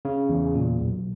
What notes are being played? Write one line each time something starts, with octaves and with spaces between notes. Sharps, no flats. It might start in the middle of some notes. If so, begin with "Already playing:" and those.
C#3
E2
A#2
B1